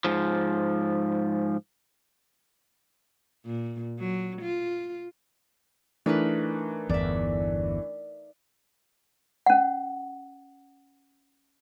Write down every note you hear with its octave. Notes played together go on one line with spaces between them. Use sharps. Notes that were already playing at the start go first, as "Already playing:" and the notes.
G#2 F3
A#2
F#3
F4
E3 A3 D4 D#4 A#4 B4
G1 E2 D5 E5
C#4 F#5